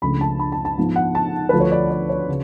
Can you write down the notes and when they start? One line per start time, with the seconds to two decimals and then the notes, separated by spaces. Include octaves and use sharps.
0.02 C#2 C#3 F3 A3 D4 B5
0.21 A5
0.39 B5
0.52 A5
0.65 A5
0.77 G#2 F3 B3
0.96 F#5
1.15 A5
1.49 D2 D3 F3 A3 B4
1.60 C#5
1.72 D5
1.91 D5
2.09 C#5
2.28 C#3